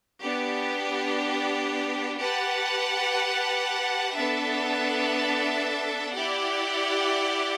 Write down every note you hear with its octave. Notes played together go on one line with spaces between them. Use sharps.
B3 D4 G4
G4 B4 F#5 A5
B3 D4 A4 E5 A5
E4 G4 D5 F#5